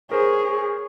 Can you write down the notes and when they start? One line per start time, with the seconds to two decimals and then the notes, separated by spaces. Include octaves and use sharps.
0.11 G#4 A#4 C5 C#5